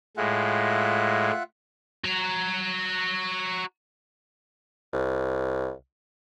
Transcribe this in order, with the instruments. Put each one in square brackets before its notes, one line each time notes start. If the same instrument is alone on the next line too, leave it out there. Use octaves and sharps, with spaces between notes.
[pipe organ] A2 G#3 [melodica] F4 E5 F#5
[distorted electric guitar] F#4 A#5
[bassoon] C2